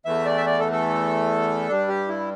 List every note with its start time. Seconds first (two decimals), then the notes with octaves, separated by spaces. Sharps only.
0.05 E2 E3 A3 E5
0.26 D5
0.37 E5
0.46 D5
0.60 A4
0.72 A4
1.68 G2 G3 D4
1.88 G4
2.08 E4